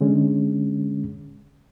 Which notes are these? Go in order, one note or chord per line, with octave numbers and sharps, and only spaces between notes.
D3 G#3 C#4